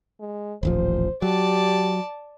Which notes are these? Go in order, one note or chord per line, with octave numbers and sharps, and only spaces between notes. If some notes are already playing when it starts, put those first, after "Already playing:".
G#3
D#1 A1 F3 C5
F#3 G4 D5 A5